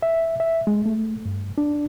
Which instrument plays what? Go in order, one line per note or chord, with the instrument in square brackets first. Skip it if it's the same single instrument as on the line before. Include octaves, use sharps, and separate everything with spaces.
[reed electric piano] E5
E5
G#3
A3
G2
D4